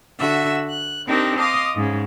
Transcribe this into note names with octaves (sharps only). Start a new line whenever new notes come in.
D3 F#4 E5 E6
F#6
C4 D4 D#4 G4 A4 A#4
D#5 F5 C6 D6 D#6
G#2 C#3